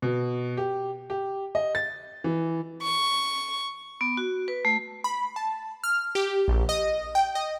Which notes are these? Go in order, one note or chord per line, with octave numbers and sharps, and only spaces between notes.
B2
G4
G4
D#5
A6
E3
C#6
B3
F#4
B4
A3
B5
A5
F6
G4
A#1
D#5
G5
D#5